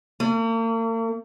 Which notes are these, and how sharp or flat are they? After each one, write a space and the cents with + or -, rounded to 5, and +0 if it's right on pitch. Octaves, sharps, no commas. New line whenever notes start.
A#3 -45